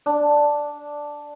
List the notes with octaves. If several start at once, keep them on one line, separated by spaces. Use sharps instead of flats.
D4